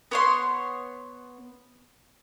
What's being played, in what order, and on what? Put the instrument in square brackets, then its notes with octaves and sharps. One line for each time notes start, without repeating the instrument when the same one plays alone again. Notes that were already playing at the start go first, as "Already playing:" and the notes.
[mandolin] B3 C#5 C6